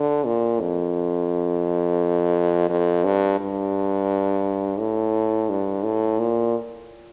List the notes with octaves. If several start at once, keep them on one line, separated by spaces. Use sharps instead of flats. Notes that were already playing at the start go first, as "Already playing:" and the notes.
Already playing: D3
A#2
F2
F2
G2
G2
A2
G2
A2
A#2